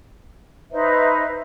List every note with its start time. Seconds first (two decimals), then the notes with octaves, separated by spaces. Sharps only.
0.71 D#4 B4 C5 E5